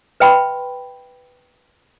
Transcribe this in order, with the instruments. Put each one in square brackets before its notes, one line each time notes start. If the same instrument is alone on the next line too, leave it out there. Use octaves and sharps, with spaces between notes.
[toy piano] B4 E5 G5 B5 C6